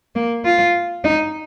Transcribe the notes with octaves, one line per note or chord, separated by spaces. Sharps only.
A#3
F4
D#4